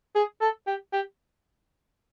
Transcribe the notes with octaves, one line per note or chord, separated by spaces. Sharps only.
G#4
A4
G4
G4